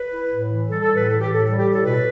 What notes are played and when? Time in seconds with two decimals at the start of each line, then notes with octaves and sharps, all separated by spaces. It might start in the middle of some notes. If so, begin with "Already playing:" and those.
Already playing: B4
0.11 E4
0.31 A2
0.50 E3
0.68 G3 A4
0.82 A4
0.88 A2
0.94 B4
1.07 E3 A4
1.20 G4
1.26 A2
1.33 A4
1.45 G3 A4
1.58 G4
1.65 A2
1.71 A4
1.84 B2 B4